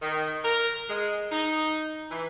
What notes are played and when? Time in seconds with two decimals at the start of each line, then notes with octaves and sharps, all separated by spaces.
0.02 D#3
0.44 A#4
0.89 G#3
1.32 D#4
2.11 E3